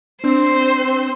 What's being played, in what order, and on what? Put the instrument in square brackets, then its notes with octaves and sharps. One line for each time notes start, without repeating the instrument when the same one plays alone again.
[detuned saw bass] C4 [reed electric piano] D4 [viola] C5